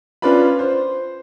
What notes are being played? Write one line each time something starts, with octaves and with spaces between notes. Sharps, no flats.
C#4 D4 F4 B4 D5 B5
C5